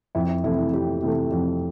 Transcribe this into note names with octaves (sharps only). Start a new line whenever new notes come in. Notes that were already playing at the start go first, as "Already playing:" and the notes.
F2 E4
E4
C3 E3 A3 E4
E4
F2 E4 G4
C3 E3 A3
F2